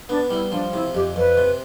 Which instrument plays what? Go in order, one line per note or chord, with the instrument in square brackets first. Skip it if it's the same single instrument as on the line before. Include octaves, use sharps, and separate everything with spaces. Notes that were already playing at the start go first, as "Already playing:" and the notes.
[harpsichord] B3 [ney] D4
[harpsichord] G3 [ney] E4
[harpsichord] F3 [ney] D4
[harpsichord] C3 [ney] E4
[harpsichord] F2 [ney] G4
[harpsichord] F2 [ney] B4
[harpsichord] C3